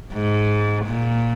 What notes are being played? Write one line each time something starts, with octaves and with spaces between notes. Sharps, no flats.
G#2
A#2